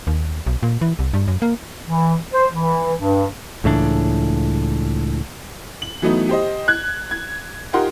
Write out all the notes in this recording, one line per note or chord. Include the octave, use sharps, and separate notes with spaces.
D#2
B1
A#2
E3
C2
G2
F#2
A#3
E3
C5
E3
G2
C#2 A2 E3 D4
F#7
E3 F#3 A3 B3 D#4
G4 C5 D#5
F#6 G#6
G#6
D#4 F4 G4 A#4 F#5 C6